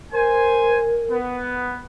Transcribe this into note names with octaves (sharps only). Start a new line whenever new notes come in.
A#4 C5 G#5
B3